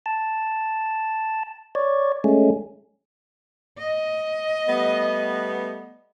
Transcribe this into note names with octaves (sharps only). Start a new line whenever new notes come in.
A5
C#5 D5
G#3 A3 C#4
D#5
G3 A3 B3